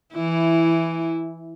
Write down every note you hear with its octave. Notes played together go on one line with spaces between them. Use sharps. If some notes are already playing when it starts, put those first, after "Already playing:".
E3 E4